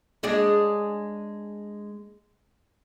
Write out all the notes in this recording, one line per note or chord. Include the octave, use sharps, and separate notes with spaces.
G#3 D4 G#4